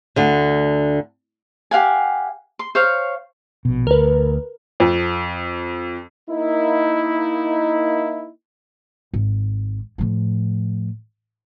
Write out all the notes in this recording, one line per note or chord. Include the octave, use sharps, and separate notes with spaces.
D2 D3
G4 F5 F#5 G#5
C6
C5 C#5 F5
A#1 B2
D2 A#4 B4
F2
A#3 D#4 E4
G#1
A2 F3